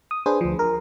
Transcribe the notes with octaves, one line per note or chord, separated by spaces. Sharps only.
D#6
D4 G#4 B4 C5
D2 F3
A#4